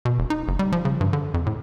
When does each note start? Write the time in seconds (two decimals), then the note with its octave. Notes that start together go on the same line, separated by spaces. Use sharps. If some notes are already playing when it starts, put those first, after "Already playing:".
0.05 B2
0.19 E1
0.30 D#4
0.48 F#1
0.59 G3
0.72 F3
0.85 C#3
1.01 G2
1.13 D3
1.34 F2
1.46 A2